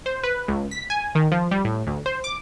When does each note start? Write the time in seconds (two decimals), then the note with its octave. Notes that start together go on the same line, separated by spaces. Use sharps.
0.06 C5
0.23 B4
0.48 C#2
0.71 B6
0.90 G#5
1.15 D#3
1.32 F3
1.51 G3
1.65 A2
1.87 D2
2.06 C5
2.24 D6